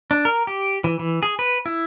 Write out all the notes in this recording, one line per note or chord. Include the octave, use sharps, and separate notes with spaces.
D4
A#4
G4
E3
E3
G#4
B4
E4